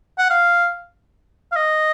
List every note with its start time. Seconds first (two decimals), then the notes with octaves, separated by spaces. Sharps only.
0.18 F#5
0.30 F5
1.52 F5
1.56 D#5